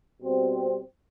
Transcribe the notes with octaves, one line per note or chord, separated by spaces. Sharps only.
B2 G3 C4